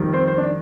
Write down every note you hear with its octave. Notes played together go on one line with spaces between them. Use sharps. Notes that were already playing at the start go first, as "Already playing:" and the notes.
Already playing: F2 D#3 G3
C4 C5
C5
D4 D5